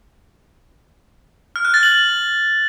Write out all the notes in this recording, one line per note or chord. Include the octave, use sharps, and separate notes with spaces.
F6
F#6
A6
F#7